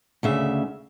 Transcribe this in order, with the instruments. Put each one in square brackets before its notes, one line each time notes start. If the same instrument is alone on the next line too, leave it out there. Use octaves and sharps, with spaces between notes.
[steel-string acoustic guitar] D2 C#3 E5